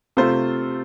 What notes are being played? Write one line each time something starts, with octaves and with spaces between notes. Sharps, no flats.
C3 A3 F4 C5